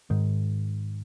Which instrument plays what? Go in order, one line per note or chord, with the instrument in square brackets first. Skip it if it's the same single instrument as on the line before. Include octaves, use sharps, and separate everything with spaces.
[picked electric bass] G#2 D#3